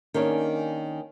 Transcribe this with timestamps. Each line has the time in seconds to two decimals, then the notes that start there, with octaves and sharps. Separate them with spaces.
0.14 D#3 A#3 C#4 D4 G#4